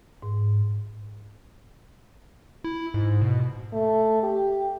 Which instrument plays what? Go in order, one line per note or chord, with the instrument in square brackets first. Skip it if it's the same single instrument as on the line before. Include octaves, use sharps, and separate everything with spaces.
[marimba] G#2
[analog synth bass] E4
G#2
B2
[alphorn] A3
G4